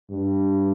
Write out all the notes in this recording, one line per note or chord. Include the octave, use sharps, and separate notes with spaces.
G2